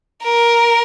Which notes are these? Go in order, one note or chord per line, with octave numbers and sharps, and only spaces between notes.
A#4